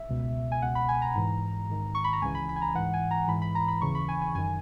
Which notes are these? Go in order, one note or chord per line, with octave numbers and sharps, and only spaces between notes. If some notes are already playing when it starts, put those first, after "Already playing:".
Already playing: E5
C#2 B2
G#5
C#2 B2 F#5
B5
G#5
A#5
G#2 E3
G#2 D#3
C#6
B5
A#5
C#2 C#3 E3 G#5
B5
B5
G#5
A#5
G#2 E3 F#5
G#5
A#5
G#2 E3 B5
B5
A#5
B5
D#2 C#3 E3 C#6
B5
G#5
G#5
F#2 D#3 G#5